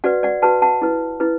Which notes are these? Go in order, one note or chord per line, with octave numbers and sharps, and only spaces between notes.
F#4 B4 D5 F#5
D5 F#5
F#4 B4 F#5 A5
F#5 A5
E4 B4
E4 B4